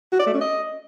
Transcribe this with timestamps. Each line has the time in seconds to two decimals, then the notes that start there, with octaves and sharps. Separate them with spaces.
0.12 F#4
0.19 D5
0.27 A3
0.34 C#4
0.41 D#5